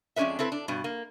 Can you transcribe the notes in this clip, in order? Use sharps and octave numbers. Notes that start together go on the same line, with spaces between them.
F2 G#3 C#4 D4 B4 E5
C4 E4 A4 B4
D4
G2 B2
A#3